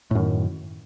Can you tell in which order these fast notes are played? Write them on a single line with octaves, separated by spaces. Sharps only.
A2 F#2 D#3